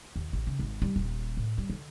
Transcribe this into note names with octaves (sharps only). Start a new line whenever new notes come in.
D#2
A1
C#3
G#1
G3
D#1
A2
G3
D3